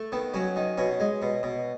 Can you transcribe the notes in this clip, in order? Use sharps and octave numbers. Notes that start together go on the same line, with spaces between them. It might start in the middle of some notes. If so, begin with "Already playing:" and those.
Already playing: A3
D#3 B3
F#3 C#4
D#3
B2 C#4
G#3
B2
B2